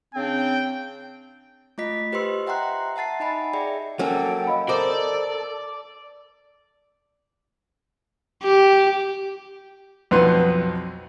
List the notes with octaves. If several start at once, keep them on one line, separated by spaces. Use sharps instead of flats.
C#3 C4 D4 G5
A3 F4 D#5 B6
G4 B4 C5 D#5 C6 E6
E5 F#5 G5 A#5 C6 F#6
E5 F#5 A5 A6 C7
D#4 D#5 G#5 B5
G#4 D5 E5 G5
F#3 A#3 C#4 A4 F#5 G5
D#5 F5 B5
A4 A#4 C5 D5 D#6
G4
B1 F2 B3 B4 C6